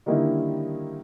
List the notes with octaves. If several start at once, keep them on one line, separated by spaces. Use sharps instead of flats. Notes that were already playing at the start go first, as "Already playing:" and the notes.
D3 D#3 G3 A#3 D#4 E4